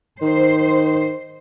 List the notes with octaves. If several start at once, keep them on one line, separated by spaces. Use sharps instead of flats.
D#3 C5